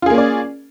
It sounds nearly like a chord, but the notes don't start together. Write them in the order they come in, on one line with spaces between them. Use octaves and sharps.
F4 G#4 A#3 C#4 D5